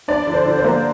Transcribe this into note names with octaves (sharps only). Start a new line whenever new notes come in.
D4 D5
D3
C5
D3
C5
A#3